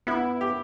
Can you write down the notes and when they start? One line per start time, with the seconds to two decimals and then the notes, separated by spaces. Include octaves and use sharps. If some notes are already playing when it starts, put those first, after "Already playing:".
0.07 B3 E4
0.41 G4